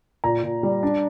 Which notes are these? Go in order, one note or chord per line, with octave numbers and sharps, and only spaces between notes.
A#2 A#5
A#2
G3
D4